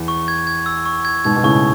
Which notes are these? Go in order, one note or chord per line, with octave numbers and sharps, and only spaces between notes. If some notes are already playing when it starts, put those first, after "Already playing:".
Already playing: E2
C#6
G#6
G#6
E6
C#6
G#6
G#2 B2 G#6
B2
A2 C#3 C#6